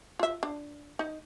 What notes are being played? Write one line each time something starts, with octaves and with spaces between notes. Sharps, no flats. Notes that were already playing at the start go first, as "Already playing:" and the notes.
F4 E5
D4
D#4